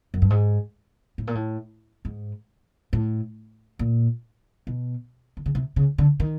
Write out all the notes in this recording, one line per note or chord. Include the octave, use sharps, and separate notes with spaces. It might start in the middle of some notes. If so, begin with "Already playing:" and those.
F#2
G2
G#2
A2
A#2
A2
G#2
A2
A#2
B2
D3
C#3
C3
C#3
D3
D#3